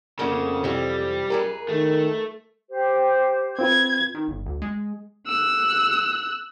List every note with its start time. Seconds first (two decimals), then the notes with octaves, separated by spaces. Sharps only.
0.19 F2 C#3 A#3 B3 D#4
0.64 C3 E3 G3 C4
1.30 F2 G#4 A#4 B4
1.69 D#3 A3
2.69 G4 C5
3.59 C4 F4 B4 G#6
4.15 D#3
4.28 G1
4.46 D2
4.62 G#3
5.27 E6 F#6